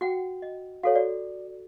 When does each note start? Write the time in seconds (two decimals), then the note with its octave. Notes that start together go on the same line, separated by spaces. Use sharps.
0.01 F#4 F#5 G5
0.42 D#5
0.83 F#4 A4 C#5 F5
0.96 F#4 D5